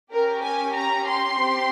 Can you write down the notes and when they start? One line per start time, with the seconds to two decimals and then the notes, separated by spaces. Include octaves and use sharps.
0.12 C#4 G4 A#4
0.44 G#5
0.75 A#5
1.08 C6
1.40 C4 G4